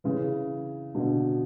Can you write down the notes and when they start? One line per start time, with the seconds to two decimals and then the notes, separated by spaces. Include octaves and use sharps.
0.04 C#3 E3
0.95 B2 D3